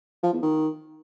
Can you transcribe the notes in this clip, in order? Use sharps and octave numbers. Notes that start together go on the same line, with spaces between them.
F3
E2
D#3